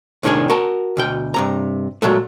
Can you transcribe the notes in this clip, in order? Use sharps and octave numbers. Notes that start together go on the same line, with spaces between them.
C2 A2 D#3 D4 G#4
F#4 A#4 A5
D2 B2 G5
G2 C3 A#5
A#2 F#3 G#3 A3